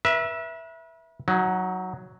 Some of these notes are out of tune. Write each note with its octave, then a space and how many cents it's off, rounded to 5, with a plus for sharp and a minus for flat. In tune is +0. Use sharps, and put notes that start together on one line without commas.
B4 -40 E5 +0
F#3 +0 D#4 +30